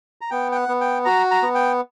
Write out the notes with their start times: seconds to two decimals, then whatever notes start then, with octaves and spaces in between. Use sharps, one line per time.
0.21 A#5
0.31 B3 G5
0.52 G5
0.55 F#5
0.68 B3
0.81 G5
1.05 F#4 A#5
1.31 A#5
1.43 B3
1.55 G5